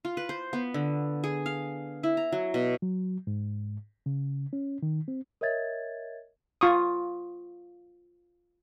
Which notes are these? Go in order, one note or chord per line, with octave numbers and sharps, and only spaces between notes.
F4
B4
C5
B3
D3
G#4
F5
E4
A#5
F#3
B2
F#3
G#2
C#3
C#4
D#3
C4
A#4 C#5 D#5 E5 G#6 A6
F4 C#6 D#6